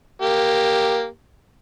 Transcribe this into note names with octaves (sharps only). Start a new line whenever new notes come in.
A#3 G4